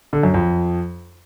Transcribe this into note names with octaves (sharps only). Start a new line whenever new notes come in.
D3
F#2
F2